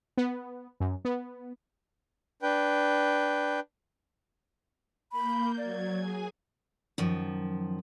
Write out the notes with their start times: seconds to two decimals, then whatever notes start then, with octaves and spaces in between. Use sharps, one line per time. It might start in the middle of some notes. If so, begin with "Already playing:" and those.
0.17 B3
0.80 F#2
1.05 B3
2.42 D4 B4 G5
5.12 A#3 B5 G6
5.58 F#3 D5 G#6
5.97 G#4 G#5
6.98 F#2 D#3 F3